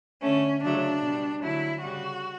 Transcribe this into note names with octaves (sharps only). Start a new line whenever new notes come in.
D3 A3 C#4
C#3 F#3 A3 D4
B2 G3
D3 F#3 A3 E4
C#3 G3 F#4